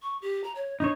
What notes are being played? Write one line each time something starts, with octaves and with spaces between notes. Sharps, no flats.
C#6
G4
A#5
C#5
D4 D#4 C#5